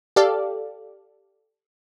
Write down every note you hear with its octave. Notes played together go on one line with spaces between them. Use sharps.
G4 A4 D5 F5